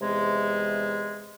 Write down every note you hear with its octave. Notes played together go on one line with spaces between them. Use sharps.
E2 C3 G#3